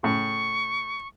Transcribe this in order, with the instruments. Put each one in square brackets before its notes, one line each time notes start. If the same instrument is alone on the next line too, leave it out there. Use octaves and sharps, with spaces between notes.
[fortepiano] A2 C#3 [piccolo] C#6